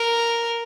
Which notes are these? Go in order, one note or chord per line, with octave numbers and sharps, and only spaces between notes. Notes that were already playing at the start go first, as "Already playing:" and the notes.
Already playing: A#4